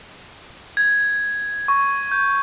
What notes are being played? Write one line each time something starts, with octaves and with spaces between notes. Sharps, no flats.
G#6
C#6
G6